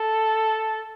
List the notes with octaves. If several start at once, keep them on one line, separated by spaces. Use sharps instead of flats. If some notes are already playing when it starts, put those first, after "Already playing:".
Already playing: A4